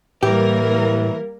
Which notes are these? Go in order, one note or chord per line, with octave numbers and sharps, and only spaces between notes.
A2 E3 G3 A#3 G4 A#4